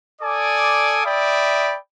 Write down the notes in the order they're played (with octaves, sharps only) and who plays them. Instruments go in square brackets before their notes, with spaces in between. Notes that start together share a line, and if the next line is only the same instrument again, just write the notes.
[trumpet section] A4 D5 G#5 D6 D#6
D5 E5 G5 B5 D#6